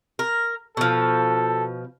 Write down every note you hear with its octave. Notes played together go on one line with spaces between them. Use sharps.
A#4
B2 F3 A4